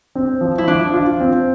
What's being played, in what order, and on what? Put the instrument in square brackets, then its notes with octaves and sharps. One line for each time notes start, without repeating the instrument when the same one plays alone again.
[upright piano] C4
F3
[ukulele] E4
[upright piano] F3 [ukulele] D4
[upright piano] F4
C4